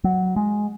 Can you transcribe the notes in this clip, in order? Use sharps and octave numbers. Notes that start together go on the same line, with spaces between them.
F#3
G#3